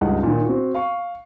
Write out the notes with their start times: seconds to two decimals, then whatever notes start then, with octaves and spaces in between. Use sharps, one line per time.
0.01 C#2 G2 D#4 F#5
0.23 A#2 D#3
0.45 C4 F#4
0.74 F5 C#6